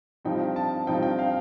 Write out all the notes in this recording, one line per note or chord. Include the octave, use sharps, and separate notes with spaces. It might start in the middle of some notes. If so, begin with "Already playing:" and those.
G2 F3 C4 D#4 G5
A5
G2 F3 C4 D#4 G5
G5
F5